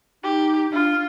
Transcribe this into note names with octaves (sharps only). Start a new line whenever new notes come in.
D#4 G4
D4 F4